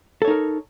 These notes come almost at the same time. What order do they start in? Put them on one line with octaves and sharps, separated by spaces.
A4 C#5 D#4 A#4